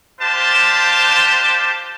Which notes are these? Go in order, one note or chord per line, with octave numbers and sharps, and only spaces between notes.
D4 F4 G4 C5 A5